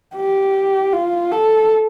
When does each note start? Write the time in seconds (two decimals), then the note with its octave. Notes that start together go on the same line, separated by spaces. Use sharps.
0.16 G4
0.93 F4
1.31 A4